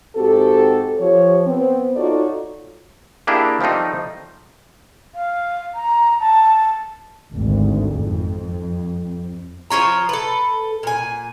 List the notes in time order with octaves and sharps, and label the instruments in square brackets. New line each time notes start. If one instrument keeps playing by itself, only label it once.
[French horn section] G#2 C4 F#4 G4 A4
F3 G4 C#5
B3 C4
D#4 F4 F#4 A4 C#5 D5
[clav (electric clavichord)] A#3 D4 E4 G4 G#4
F3 G3 A3 C4 D#4
[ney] F5
A#5
A5
[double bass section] G#1 D2
F2
[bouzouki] F3 F4 C#5 A#5
A4 B4
A#2 G#5